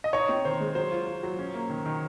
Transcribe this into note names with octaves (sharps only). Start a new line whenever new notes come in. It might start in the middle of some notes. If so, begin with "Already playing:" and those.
D#5
D#4 C#5
C4
D#3 C5
G#3
F#3 C5
F4
F4
F#3
C#4
A#3
D#3
D#3